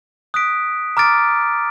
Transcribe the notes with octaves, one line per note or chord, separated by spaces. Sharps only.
D#6 F#6 B6 D7
A#5 D6 F6 A6 D7